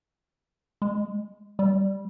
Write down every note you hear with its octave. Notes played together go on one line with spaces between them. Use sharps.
G#3
G3